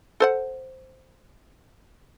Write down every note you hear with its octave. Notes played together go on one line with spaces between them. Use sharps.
A4 C5 F#5